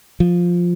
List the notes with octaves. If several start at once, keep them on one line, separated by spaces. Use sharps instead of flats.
F3